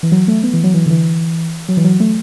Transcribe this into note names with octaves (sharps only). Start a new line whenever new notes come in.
E3
F#3
A3
B3
E3
F#3
E3
D3
E3
F#3
E3
F#3
A3